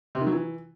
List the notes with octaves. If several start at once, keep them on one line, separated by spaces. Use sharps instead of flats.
C3
D#3
F#3
E3